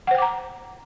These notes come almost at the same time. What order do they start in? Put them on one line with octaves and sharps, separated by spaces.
F#5 C5 G5 D6 A#5